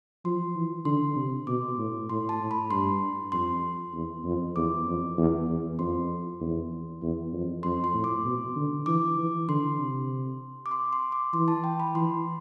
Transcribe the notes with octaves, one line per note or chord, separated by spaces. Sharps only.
F3 C6
E3
D3 C6
C3
B2 D6
A2
A2 C6
A5
A2
B5
G2 C6
F2 C6
E2
F2
E2 D6
F2
E2
E2
F2 C6
E2
E2
F2
F2 C6
C6
A2
D6
B2
D3
E3 D6
E3
D3 C6
C3
D6
C6
C6
D6
E3 C6
A5
G5
B5
E3 C6